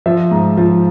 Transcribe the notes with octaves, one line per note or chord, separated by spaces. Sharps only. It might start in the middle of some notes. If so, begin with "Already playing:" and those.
F3 E5
G#2
F3